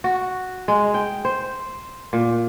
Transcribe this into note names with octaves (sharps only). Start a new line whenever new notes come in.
F#4
G#3
G5
C5
A#2